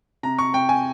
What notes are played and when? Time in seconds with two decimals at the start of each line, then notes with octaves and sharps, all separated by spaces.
0.23 C3 A#5
0.39 C#6
0.54 C3 G5
0.69 G#5